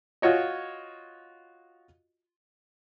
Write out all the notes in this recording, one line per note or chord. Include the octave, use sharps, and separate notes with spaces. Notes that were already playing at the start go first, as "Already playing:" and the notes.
F4 F#4 C#5 D#5